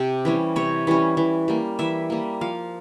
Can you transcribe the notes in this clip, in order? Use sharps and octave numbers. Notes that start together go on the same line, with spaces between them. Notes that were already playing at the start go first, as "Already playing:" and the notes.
Already playing: C3 G4
E3 G3 C#4
C3 C#5
E3 G3 C#4
E3
G3 A#3
E3 E5
G3 A#3
F3 F5